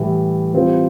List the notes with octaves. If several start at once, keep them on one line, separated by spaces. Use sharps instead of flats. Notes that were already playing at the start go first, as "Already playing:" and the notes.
Already playing: A2 E3 G3
E3 G3 C4 F4